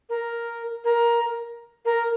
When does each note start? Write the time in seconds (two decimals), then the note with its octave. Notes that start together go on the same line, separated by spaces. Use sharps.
0.09 A#4
0.84 A#4
1.85 A#4